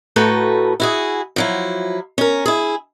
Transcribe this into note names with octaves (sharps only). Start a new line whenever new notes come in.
A2 A3 F#4 A4 B4 A#5
E4 F#4 G#4
F3 F#3 E4
C#4 A#4
E4 G#4